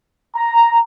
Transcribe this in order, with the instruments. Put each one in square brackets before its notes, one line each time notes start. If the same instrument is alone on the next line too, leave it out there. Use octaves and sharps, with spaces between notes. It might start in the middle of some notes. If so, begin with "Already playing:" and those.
[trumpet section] A#5